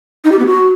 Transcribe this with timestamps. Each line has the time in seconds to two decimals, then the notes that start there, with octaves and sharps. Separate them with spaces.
0.24 D#4
0.32 G4
0.39 B3
0.46 F#4